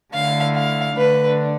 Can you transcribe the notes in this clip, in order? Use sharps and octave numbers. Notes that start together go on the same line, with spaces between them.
D3 A3 E4 F5
F5
D3 A3 D4 B4